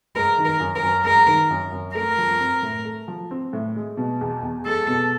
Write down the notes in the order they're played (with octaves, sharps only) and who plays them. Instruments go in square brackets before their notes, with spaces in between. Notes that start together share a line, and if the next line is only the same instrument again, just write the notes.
[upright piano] G#3 [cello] A#4
[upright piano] D#3
[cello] A#4
[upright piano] F#2
[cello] A#4
[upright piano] F#2
[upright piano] G#3 [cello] A#4
[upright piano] D#3
F#2
F#2
[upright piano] A3 [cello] A#4
[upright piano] F3
C4
A2
A3
F3
C4
A2
G#3
B2
E2
E2
[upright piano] G#3 [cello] A4
[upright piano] B2